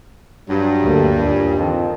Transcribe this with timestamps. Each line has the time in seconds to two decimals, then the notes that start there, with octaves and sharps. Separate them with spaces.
0.49 G2 F#3
0.81 D2 A3 A#3
1.17 D#2 A#2 G3
1.58 F2 D#3